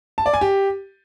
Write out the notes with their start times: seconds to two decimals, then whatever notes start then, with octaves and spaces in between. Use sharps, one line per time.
0.18 A5
0.26 D5
0.34 G#5
0.41 G4